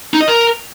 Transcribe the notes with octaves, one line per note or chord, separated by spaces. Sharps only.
D#4
D#5
A#4